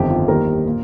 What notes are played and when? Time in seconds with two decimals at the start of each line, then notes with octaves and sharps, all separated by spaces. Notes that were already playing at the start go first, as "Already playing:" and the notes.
Already playing: G1 F2 D#3 G3 G4
0.10 F4
0.28 D#2 D#3 G3 A#4
0.67 A#2